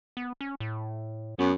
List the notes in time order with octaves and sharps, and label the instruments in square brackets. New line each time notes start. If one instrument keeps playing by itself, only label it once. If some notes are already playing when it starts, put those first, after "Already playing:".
[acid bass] B3
C#4
A2
[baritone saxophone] F#2 [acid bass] B3